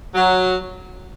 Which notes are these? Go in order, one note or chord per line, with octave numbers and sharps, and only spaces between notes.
F#3